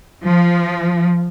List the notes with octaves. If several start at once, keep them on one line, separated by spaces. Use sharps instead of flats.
F3